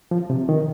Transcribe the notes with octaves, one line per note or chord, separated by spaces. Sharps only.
F3
C3
D#3